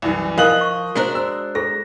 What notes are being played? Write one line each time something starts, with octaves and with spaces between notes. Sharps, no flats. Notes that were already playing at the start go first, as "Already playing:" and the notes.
C2 F#2 E3
F3 F4 A#4 D#5 F5 F#6 F#7
C#6
G#3 D4 F#4 A#4 C5
E6
E4 G#4 A4 A#6